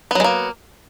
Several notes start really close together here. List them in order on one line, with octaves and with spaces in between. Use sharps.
B3 F#3 G#3 A#3